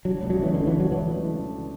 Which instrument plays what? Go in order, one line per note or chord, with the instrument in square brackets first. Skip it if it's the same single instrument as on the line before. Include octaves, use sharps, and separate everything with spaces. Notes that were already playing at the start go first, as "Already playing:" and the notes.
[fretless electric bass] F#3 [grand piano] D4
[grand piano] C#2
[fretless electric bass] F#3
[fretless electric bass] E3 [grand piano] A3
[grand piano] B2 [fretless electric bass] D3
[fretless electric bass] E3
[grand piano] D4
[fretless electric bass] F#3
[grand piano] C#2 [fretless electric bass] E3
[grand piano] A3
B2
D4